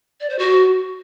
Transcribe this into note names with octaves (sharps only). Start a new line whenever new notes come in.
D5
C5
F#4